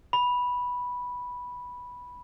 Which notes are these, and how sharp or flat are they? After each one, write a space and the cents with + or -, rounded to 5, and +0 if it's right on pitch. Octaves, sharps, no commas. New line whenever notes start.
B5 -5